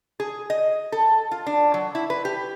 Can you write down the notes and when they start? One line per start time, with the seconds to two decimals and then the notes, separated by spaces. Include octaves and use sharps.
0.20 G#4
0.50 D#5
0.92 A4
1.31 F4
1.47 D4
1.74 F#3
1.95 E4
2.10 B4
2.25 G4